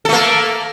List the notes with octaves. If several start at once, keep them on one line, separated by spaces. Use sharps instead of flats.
A3 A#3 A4